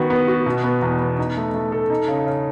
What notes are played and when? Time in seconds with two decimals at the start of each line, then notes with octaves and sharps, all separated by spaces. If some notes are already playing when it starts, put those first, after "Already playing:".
Already playing: D#3 B3 F#4
0.10 B3
0.28 F#4
0.46 B2
0.64 B3
0.82 E2
1.00 B3
1.18 D#4
1.37 A3
1.54 A3
1.72 A4
1.90 D#4
2.08 C#3
2.26 C#3